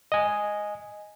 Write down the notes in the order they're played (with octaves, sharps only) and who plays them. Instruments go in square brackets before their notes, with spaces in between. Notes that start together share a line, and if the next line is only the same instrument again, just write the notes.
[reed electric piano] D#5 G#5